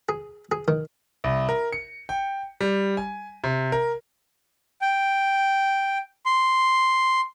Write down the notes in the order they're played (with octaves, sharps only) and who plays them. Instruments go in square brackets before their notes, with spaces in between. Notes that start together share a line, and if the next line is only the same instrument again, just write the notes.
[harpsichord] G#4
G#4
D#3
[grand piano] C2
A#4
C#7
G5
G3
G#5
C3
A#4
[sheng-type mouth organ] G5
C6